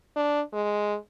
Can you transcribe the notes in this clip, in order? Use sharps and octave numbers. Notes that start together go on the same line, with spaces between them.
D4
G#3